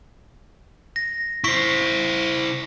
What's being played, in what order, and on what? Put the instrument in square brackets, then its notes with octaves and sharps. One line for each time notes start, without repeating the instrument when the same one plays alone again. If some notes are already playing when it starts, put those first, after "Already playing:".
[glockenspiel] A#6
[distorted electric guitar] E4 C5 [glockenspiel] C#6 B6